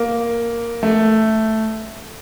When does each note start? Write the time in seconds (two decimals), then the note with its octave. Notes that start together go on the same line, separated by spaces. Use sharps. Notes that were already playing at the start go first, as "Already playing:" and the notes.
Already playing: A#3
0.83 A3